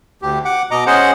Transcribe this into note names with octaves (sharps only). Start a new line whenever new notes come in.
D2 G4
F#5 D6
B2 D#5 A#5 D6
C#4 G#4 C5 D#5 F#5